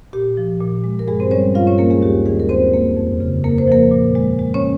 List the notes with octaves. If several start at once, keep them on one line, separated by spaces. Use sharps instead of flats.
A#2 G4
F3
A#2
G#3
A#4
G2 G#3 G#4
C4 C5
G3 C#4 C#5
G2 F4 F5
C#4 C#5
A#3 A#4
G#3 G#4
D#2 G4
D#3 G#3 G#4
A#4
D#2 C4 C5
A#3
F2
C#3
A#3 A#4
C5
F3 A#3 A#4
A#2
G#3
G#3
C#4 C#5